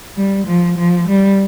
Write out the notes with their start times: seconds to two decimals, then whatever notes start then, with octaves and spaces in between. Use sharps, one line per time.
0.17 G3
0.47 F3
0.78 F3
1.08 G3